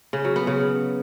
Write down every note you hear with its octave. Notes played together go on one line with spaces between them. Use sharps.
C#3
F#3
B3
C#3